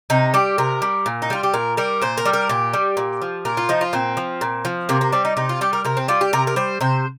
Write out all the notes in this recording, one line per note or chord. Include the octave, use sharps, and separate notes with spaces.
C3 D#4
G3 G4
C3 A#4
G3
A#2
D#4
G3 F4
G4
A#2 A#4
G3 A#4
A#2 C5
A#4
G3
A#4
A#2 G4
G3
A#2
F3
A#2 A#4
F4
F3 D#4
F4
A#2 C4
F3
A#2
F3
C3 A#3
A#3
G3 C4
D#4
C3 D#4
F4
G3 G4
A#4
C3 A#4
C4
G3 F4
G4
C3 A#4
A#4
G3 C5
C3 C5